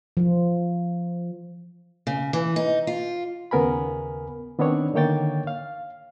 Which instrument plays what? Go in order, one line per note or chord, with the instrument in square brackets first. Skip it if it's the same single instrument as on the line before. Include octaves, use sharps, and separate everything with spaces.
[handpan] F3
[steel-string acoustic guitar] C#3
E3
D#4
F4
[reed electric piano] D#2 C#3 B3 A#4 G#5 B5
D#3 B3 C4 D4 C#5
D3 D#3 A#3 C#5 G5 A6
F5